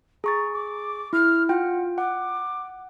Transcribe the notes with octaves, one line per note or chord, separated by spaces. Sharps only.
G#4 A#5 C#6 A6
D6
E4 F6
F4 F#5 G5
F#5 D6